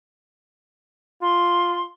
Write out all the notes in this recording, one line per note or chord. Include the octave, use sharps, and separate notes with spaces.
F4 C6